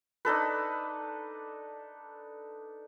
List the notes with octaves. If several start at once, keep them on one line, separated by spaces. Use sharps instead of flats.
D4 D#4 A4 B4